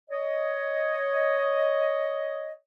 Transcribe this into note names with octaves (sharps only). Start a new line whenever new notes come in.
C#5 D#5